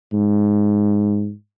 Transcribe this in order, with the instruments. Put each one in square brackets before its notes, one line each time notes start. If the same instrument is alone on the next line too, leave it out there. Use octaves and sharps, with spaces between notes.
[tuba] G#2